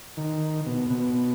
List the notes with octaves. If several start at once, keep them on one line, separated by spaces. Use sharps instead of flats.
D#3
B2
B2